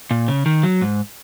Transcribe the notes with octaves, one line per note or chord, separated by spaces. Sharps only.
A#2
C#3
D#3
F#3
G#2